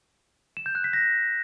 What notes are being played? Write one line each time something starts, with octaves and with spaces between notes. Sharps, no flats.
E7
G6
F#6
B6
A#6